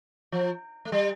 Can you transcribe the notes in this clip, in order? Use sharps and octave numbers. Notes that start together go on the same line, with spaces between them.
F3
A3
G3